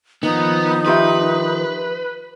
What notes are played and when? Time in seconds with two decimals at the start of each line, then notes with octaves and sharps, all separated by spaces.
0.23 D#3 F3 B3 D#4
0.86 F4 G4 B4 E5